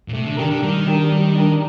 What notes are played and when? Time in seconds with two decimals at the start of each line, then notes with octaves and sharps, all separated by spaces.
0.08 A#2
0.13 C3 A3
0.25 D3
0.37 D#3 D4 G4 A#4
0.50 D3
0.62 D#3 G3
0.87 D4 G4 A#4
1.12 G3
1.35 D4 G4 A#4